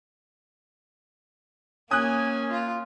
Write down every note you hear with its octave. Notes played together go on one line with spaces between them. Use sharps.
A#3 C#4 G#5 D#6 F#6
F4